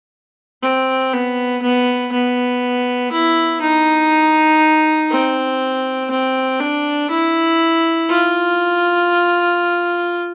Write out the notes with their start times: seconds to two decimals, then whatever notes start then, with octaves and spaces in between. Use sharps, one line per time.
0.62 C4
1.13 B3
1.63 B3
2.12 B3
3.12 E4
3.61 D#4
5.11 C4
6.11 C4
6.60 D4
7.10 E4
8.09 F4